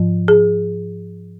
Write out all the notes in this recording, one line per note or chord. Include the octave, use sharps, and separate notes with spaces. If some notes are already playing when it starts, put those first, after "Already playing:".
Already playing: G#2 F3
G#4